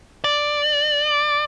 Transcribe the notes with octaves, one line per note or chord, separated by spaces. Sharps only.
D5